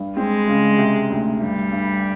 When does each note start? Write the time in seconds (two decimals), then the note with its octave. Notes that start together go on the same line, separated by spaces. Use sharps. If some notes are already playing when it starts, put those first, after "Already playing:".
Already playing: G2
0.17 G#3 C4
0.48 C#3
0.78 C3
1.10 D2
1.40 G2 G3
1.71 G2